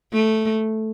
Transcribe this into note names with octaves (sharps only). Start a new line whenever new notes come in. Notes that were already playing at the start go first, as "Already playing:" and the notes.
A3